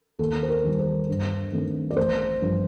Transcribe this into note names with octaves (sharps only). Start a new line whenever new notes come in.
D#2 A4
C5
A#4
D#3 G3
C5
G2
D#3 A3 C4
D5
A1 C5
G2 F3